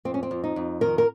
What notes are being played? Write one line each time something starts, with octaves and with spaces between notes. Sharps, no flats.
F2 C4
C#4
C4
F2
D#4
F2
D#3 A#4
A#4